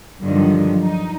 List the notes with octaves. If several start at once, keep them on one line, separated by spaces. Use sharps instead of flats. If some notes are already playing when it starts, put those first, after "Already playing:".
G2 D3 D#3 F3 F#3
D#4